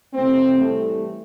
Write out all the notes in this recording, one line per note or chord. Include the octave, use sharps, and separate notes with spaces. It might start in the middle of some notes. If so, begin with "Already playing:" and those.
C3 E3 G3 A3 C4
A2 E3 G3 A3